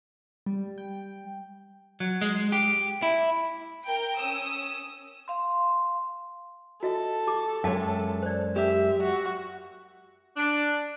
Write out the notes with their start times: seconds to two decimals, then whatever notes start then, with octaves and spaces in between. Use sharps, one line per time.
0.46 G3
0.78 G5
2.00 F#3
2.21 G#3
2.52 G4
3.02 E4
3.86 A#4 G5
4.17 C#4 D#6 E6
5.28 F5 C6
6.83 F#4 A4 D#5 E5
7.27 G4 D6
7.64 F#2 G#3 C#5 E5 G5 A5
8.23 C5 D5
8.56 G4 E5
9.03 F#4
10.36 D4